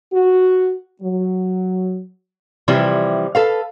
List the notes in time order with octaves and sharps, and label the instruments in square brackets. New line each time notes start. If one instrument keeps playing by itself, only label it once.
[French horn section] F#4
F#3
[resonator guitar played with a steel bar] C3 E3 F3 G3 E4
A4 B4 F5